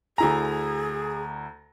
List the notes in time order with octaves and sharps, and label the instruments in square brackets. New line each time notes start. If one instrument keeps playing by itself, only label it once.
[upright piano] D2 E4 A#5 [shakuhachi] G#4